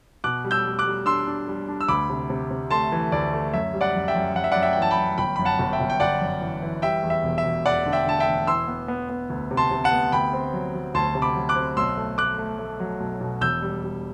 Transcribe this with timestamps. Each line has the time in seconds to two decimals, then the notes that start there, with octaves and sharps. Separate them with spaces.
0.24 B2 D6 F#6
0.44 G3
0.51 E6 G6
0.65 G3
0.79 D6 F#6
0.86 G3
1.06 D4 C6 E6
1.27 D4
1.48 G3
1.68 D4
1.81 E6
1.88 D2 B5 D6
2.10 C3
2.30 C3
2.51 C3
2.71 A3 A5 C6
2.92 E3
3.12 D2 D5
3.33 A3
3.53 F#2 E5
3.73 G3
3.81 D5 F#5
3.95 F#2
4.08 E5 G5
4.15 F#2
4.35 F#2 F#5
4.44 E5
4.52 D5 F#5
4.56 F#2
4.63 E5 G5
4.73 G5
4.77 E3 A5
4.91 G5 B5
4.98 F#2
5.18 G1 G5 B5
5.36 F#2 B5
5.45 F#5 A5
5.59 G1
5.73 E5 G5
5.80 G1
5.90 G5
6.00 G1 D5 F#5
6.21 F#2
6.41 E3
6.62 E3
6.82 G3 E5 G5
7.03 E2
7.10 E5
7.24 E1
7.38 E5
7.44 E1
7.65 E1 D5 F#5
7.86 D3
7.92 E5 G5
8.06 D3 A5
8.20 E5 G5
8.27 E1
8.47 E3 C6 E6
8.68 B3
8.88 B3
9.09 B3
9.30 D2
9.51 C3
9.57 A5 C6
9.71 C3
9.84 F#5 A5
9.91 B3
10.12 D2 G5 B5
10.33 C4
10.53 F#3
10.74 F#3
10.94 D2 A5 C6
11.15 C3
11.22 B5 D6
11.36 F#3
11.49 D6 F#6
11.56 C4
11.77 B1 C6 E6
11.97 A3
12.18 A3 D6 F#6
12.38 A3
12.59 A3
12.80 F#3
13.00 B1
13.21 B2
13.41 E1 E6 G6
13.62 G3
13.83 G3